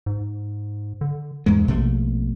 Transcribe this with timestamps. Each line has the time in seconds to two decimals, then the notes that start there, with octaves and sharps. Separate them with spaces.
0.06 G#2
1.01 D3
1.46 E2 G#2 G#3
1.68 A#1 B2 A3 A#3